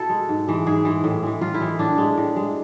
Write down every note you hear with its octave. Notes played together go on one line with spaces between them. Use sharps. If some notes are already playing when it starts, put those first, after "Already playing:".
Already playing: B2 E4 A4
G#3
G#2
E3 G#3
G#2 G#4
E3 G#3
A2
E3 G#3
A2 F4
E4
E3 G#3
A2 D4
G#3
A2
G#3